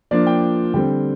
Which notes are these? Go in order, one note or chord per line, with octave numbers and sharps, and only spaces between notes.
F3 A#3 D4 F4 D5
G5
D3 G3 C4 G5